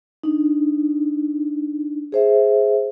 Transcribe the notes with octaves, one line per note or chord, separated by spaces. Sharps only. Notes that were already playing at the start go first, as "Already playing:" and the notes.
D4 D#4
G#4 C5 E5